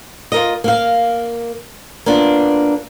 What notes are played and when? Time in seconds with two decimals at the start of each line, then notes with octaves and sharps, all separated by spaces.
0.32 F4 A#4 D#5
0.64 A#3 F5
2.06 A#3 B3 D4 F4